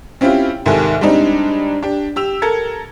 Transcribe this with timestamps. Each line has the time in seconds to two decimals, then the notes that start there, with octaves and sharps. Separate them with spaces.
0.21 C4 C#4 E4 F4 G4
0.66 C2 G#2 D#3 G4 A4 G#5
1.01 G3 G#3 C4 D4 D#4
1.83 D4 G4
2.16 G4 E6 F7
2.42 A4 A#4 G#6 C#7